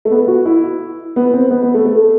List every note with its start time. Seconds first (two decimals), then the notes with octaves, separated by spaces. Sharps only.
0.05 A3
0.11 B3
0.28 F#4
0.46 E4
1.16 B3
1.34 C4
1.51 B3
1.63 B3
1.74 A3
1.85 A3